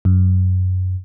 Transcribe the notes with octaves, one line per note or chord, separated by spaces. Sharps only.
F#2